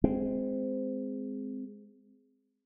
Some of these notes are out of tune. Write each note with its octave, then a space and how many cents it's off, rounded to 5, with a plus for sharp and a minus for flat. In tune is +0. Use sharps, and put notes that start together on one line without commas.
G#3 +0 C4 -15